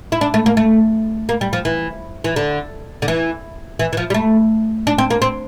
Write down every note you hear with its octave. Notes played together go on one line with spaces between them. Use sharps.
E4
D4
A3
A#3
A3
A#3
G3
F3
E3
E3
D3
D3
E3
E3
E3
F3
G3
A3
D4
C4
A#3
C4